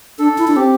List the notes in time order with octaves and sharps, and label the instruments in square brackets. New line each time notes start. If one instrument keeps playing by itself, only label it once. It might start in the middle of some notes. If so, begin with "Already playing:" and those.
[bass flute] D4 [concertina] A4
[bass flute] E4
D4
[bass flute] C4 [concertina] G4